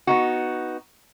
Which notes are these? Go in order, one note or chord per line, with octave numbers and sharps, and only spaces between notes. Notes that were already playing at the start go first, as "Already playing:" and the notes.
B3 D#4 F#4